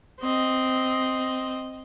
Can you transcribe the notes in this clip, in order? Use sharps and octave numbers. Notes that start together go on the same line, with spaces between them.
C4 D#5